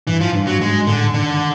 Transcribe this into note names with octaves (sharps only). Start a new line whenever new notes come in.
G2 E3
G#2 F3
G2
F#3
G#2 G#3
A2 D3
D3 D#3